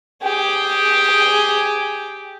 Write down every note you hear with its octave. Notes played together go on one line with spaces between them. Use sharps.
G4 G#4